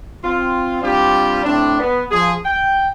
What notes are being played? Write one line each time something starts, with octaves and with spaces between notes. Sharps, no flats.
C4 F4
G3 C4 D4 F4 G4
A2 C4 D4
B3
F3 G#4
G5